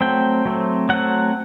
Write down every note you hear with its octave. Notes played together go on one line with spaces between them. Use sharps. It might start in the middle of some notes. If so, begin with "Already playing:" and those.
F#3 A3 C4 G5
F#3 A3 C4
F#3 A3 C4 F#5